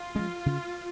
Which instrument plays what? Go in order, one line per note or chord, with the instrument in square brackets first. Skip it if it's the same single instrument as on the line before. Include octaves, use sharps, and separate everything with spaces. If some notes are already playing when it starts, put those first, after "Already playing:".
Already playing: [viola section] F4
[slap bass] F3 G#3 C#4
C#3